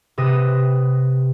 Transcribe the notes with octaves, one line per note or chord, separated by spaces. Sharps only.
C3 B4 D#6 A#6 E7